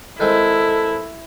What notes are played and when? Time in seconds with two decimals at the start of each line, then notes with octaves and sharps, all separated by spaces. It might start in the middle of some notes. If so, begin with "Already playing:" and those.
0.20 D#3 G#3 C4 E4 A4